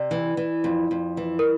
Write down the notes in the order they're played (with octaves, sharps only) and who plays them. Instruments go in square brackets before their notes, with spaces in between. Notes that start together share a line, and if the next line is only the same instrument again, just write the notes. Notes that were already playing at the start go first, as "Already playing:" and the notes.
Already playing: [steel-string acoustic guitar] C3 [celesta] D5
[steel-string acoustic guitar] E3
E3
F2
F2
E3
[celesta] A#4